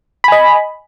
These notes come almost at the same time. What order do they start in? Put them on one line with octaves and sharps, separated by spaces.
B5 G#5 D#5